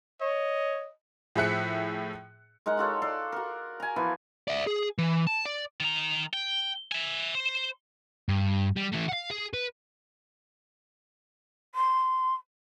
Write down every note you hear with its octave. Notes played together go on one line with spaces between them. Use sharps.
C#5 D#5
A2 F3 G#4 E5 F#6 C#7
G#3 D#4 A#4 F#5
F4 F#4 A4 C#5
A4 D5 C6
F#4 A#4
G#5 A#5
E3 F3 B3
D5 E5
G#4
E3
A5
D5
D#3 A#5
G5
E5 G#5
C5
G2
G3
E3 A3
F5 F#5
G#4
B4
C6